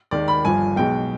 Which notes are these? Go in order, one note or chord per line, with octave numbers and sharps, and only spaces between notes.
D#2 D#3 G#3 D5
B5
G1 G2 F3 G#5
B1 B2 G#3 G5